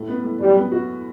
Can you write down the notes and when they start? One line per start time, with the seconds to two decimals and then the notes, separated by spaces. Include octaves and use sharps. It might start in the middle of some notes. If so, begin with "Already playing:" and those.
Already playing: A2 E4
0.08 B3
0.24 A2
0.40 F#2 G3
0.56 B3
0.72 F#4